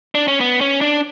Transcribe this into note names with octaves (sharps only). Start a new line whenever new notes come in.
D4
C#4
B3
C#4
D4